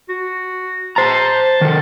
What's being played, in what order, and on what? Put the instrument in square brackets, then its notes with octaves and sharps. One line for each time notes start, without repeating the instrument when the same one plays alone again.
[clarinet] F#4
[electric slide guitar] C5 A#5 [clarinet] A5
[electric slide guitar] D#3 A4